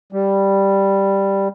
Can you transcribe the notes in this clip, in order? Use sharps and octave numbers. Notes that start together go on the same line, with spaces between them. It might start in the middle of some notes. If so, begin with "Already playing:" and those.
G3